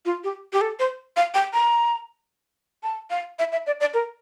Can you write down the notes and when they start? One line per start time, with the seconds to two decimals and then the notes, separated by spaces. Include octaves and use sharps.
0.05 F4
0.24 G4
0.53 G4
0.61 A4
0.79 C5
1.17 F5
1.34 G5
1.53 A#5
2.83 A5
3.10 F5
3.39 E5
3.52 E5
3.67 D5
3.81 D5
3.94 A#4